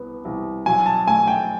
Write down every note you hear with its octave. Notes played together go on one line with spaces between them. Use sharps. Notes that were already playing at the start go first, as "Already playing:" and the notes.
Already playing: C2 B3
C2
F#3 G#5
A5
A3 G#5
G5